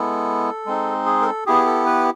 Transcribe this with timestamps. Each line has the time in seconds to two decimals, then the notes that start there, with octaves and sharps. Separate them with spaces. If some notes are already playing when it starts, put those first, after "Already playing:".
Already playing: G#3 B3 E4 A4
0.66 G#3 C4 D#4
1.06 G#4
1.22 A#4
1.26 A4
1.46 B3 E4 G4 G#4
1.66 A4
1.86 B4